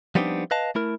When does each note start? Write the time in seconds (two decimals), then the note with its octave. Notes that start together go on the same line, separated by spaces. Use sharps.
0.15 F3 G3 B3 C4 D4 D#4
0.51 B4 D#5 F5 A5
0.75 A3 E4 A#4